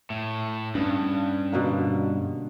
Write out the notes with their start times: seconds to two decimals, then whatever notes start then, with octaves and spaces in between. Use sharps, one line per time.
0.10 A2
0.75 G2 B3 C#4 D4
1.52 B2 D3 A#3